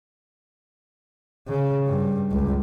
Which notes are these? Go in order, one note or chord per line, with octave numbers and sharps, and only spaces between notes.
C#3
G2
C#2